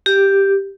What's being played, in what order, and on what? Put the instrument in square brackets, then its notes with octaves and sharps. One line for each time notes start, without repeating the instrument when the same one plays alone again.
[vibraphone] G4